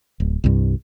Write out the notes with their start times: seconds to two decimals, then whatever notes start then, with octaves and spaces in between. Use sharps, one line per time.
0.20 D1
0.44 C2 G2